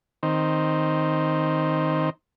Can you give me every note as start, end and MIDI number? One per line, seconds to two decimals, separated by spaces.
0.23 2.10 51
0.23 2.10 60